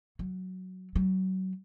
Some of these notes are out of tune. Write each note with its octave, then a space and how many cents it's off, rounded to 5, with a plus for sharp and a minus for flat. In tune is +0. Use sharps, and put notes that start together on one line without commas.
F#3 +0
F#3 +25